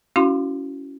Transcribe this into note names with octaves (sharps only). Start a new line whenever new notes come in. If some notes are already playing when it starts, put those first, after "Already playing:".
C#4 E4 F#4 F5 C6